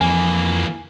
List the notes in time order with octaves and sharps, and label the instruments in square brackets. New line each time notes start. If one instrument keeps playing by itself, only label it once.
[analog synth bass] F2 [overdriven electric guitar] E3 A#3 [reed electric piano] G#5